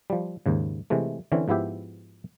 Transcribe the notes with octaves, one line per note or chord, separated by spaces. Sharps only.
F3 G3
D#2 G#2 C#3
C3 E3 G#3 A3
D3 E3 C4 C#4
G#2 F3 B3 E4 G4 E5